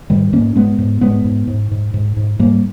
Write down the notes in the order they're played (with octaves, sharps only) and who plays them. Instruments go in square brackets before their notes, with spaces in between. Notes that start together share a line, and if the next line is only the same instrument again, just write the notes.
[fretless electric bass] G#2 D#3 G3
G#2 A#3 C#4
G#2 G#3 B3
G#2
G#2 G#3 B3
G#2
G#2
G#2
G#2
G#2
G#2 G3 A#3